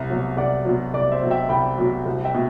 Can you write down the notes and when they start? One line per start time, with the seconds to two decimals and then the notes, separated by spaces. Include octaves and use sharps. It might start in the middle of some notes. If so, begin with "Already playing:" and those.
Already playing: C2
0.10 B2 F#3
0.37 C2 D5 F#5
0.65 B2 F#3
0.94 C2 D5
1.12 C5 E5
1.22 B2 F#3
1.30 E5 G5
1.49 C2 G5 B5
1.78 B2 F#3
2.05 C2
2.24 E5 G5
2.34 B2